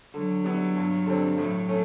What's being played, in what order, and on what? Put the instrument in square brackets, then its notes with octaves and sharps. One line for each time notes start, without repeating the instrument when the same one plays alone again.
[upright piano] D3 [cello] F#3
[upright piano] G3 B3 E4
G2
D3 G3 C4
[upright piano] A2 [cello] F#3
[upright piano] A3 C#4